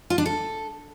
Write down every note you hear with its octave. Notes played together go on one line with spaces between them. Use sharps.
F4
D4
A4